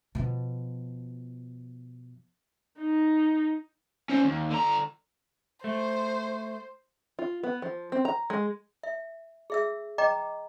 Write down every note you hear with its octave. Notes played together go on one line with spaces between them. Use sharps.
B2 F3
D#4
C#4 C5
D#2
D3 A#5
A3 C5
F4
B3
F3
C4
A#5
G#3
E5
G#4 E5 E6
D#5 G5 A#5 D6